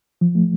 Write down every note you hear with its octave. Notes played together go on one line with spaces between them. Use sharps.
F3
A3